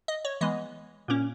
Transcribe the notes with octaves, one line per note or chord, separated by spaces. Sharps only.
D#5
C#5
E3 G#3 B3 D#5
A#2 A#3 C#4